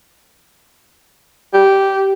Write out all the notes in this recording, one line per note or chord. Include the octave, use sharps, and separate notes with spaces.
G4